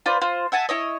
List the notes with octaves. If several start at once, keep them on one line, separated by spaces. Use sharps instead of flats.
F4 B4 C5 D5
F4 C5
E5 F#5 G#5 A5
E4 C#5 D#5